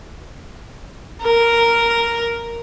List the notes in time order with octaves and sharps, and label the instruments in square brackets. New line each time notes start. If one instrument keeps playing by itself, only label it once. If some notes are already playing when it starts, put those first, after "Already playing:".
[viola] A#4